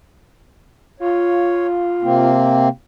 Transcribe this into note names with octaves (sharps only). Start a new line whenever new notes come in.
F4 C#5
C3 A#3 C4